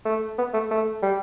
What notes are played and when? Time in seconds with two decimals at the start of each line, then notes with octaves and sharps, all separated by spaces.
0.05 A3
0.39 B3
0.54 A3
0.71 A3
1.03 G3